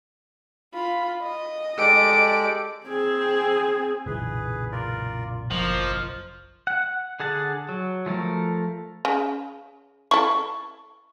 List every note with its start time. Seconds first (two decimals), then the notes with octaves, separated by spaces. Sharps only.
0.73 F4 B5
1.23 D#5
1.78 G#3 G4 A4 D5 D7
2.86 C4 G#4
4.06 F#1 B1 A#2 E3 G#4 B4
4.72 F4 A#4 D5
5.50 G1 F3 A#3 D#5 C#6
6.67 F#5
7.20 D3 G#4 F#5 A5
7.69 F#3
8.06 F3 A3 A4 A#4
9.05 C#3
10.11 E4 A4 C#6